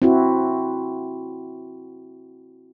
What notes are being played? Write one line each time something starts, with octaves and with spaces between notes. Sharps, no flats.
C4 E4 F#4